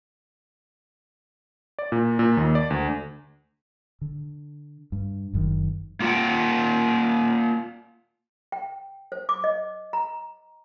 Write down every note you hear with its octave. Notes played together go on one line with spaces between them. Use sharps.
D5
A#2
A#2
D#2
D5
D2
D3
G2
F#1 F#2 A#2 D#3
A#3 F4 F#5 G5
G5
C5
D6
D#5
A#5